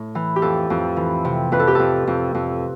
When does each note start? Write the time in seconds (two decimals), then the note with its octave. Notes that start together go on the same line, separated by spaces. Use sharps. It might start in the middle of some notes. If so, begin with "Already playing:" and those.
Already playing: A2
0.15 E3
0.36 G4
0.42 F2 A4
0.70 F2
0.97 E3
1.25 C3
1.52 F2 B4
1.60 A4
1.68 G4
1.75 F2 A4
2.07 F2
2.35 F2